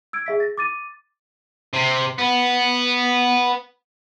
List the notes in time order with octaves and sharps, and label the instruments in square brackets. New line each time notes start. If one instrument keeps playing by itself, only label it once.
[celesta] E6 G#6 D7
G#4 E5 B6
A6 A#6
D6 A6 D#7
[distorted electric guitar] C3
B3